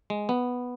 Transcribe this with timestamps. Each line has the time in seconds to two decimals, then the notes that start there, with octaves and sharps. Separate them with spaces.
0.10 G#3
0.29 B3